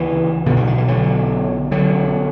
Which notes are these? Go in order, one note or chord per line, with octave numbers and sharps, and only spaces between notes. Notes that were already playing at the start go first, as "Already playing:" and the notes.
Already playing: D2 C#3 E3
B1 B2 D3
E3
D3
E3
D3 F#3
D3 F#3